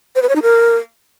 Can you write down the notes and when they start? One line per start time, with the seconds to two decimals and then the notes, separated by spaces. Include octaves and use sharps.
0.16 C5
0.22 B4
0.29 C#5
0.36 D#4
0.42 A#4